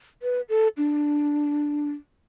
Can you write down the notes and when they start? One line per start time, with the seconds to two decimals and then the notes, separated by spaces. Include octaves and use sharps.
0.23 B4
0.49 A4
0.77 D4